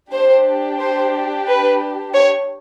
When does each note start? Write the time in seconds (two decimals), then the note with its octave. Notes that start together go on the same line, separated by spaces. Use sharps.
0.12 D4 G4 C5
0.79 C5
1.47 B4
2.14 C#5